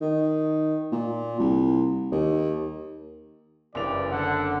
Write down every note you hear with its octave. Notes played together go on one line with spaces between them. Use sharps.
D#3
A#2
C2
D#2
F#1 G2 E3 D5 F7
D3 F#5